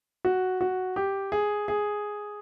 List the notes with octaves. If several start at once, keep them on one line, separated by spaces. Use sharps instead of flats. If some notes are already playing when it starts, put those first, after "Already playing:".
F#4
F#4
G4
G#4
G#4